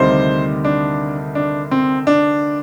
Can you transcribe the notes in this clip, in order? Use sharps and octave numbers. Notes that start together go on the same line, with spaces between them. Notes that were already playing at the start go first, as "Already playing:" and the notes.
Already playing: D2 C3 D#3 G3 C5
D4
D4
C4
D4